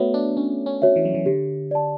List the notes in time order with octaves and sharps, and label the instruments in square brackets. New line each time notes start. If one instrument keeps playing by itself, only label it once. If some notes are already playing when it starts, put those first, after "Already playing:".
Already playing: [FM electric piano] A3 B3 [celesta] F#4 C#5 E5
[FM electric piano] D4
[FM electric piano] C#4 [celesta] D4
[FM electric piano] C#4
[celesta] F#4 C#5 E5
[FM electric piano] E3
F#3
E3
[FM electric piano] D3 [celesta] G4
[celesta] D5 A5